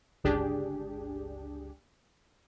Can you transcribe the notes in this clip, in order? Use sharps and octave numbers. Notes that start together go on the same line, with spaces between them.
G1 C#2 D4 G4 G#4